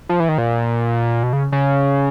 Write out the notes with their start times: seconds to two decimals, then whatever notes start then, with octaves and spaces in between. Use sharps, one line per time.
0.09 F3
0.20 E3
0.29 D#3
0.38 A#2
1.23 B2
1.33 C#3
1.52 C#3